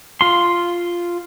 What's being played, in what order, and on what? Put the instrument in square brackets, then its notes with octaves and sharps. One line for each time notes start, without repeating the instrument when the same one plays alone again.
[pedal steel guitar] F4 C6